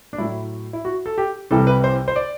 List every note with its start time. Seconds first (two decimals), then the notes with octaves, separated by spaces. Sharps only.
0.13 D4
0.18 A2 F#3 E4
0.73 E4
0.85 F#4
1.06 A4
1.18 G4
1.51 C2 C3 E3 G3 A4
1.67 B4
1.84 C5
2.08 C5
2.16 D5